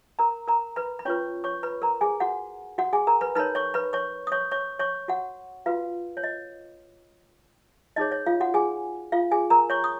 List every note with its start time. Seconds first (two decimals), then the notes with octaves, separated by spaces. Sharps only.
0.19 A#4 A#5
0.48 A#4 A#5
0.76 B4 B5
0.99 B5
1.05 C#4 F4 B4 C#5 C#6
1.44 C#5 C#6
1.63 B4 B5
1.82 A#4 A#5
2.01 G#4 G#5
2.20 F#4 F#5
2.78 F#4 F#5
2.93 G#4 G#5
3.07 A#4 A#5
3.21 B4 B5
3.35 D#4 A#4 B4 C#5 B5
3.55 C#5 C#6
3.74 B4 B5
3.93 C#5 C#6
4.27 D#6
4.32 C#5 C#6
4.52 C#5 C#6
4.79 C#5 C#6
5.08 F#4 F#5
5.66 F4 F#4 B4 F5
6.17 C#5
6.24 D#5
7.96 D#4 G#4 C#5 D#5
8.12 C#5
8.26 F4 F5
8.40 F#4 F#5
8.54 G#4 G#5
9.12 F4 F5
9.31 G#4 G#5
9.50 A#4 A#5
9.70 C#5 C#6
9.84 D#6